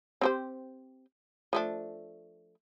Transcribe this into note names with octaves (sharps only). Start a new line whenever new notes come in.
C4 G4 C5
F3 A3 D4